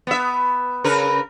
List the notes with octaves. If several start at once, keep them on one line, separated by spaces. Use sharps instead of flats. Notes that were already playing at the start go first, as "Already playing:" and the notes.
B3 E5
C#3 A#4 B4